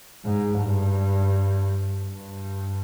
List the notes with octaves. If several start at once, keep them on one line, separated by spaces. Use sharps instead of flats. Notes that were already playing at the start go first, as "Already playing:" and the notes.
G#2
G2
G2